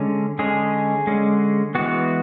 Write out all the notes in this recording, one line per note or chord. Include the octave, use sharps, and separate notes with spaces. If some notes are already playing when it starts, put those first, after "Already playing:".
Already playing: D3 G#3 C#4
D3 G#3 C#4 G#4
D3 G#3 C#4
E3 G#3 B3 F#4